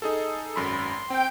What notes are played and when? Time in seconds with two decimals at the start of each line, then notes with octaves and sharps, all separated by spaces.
0.02 D#4 G#4 A4
0.56 G#1 F#2 B5 C6
1.10 C4 G5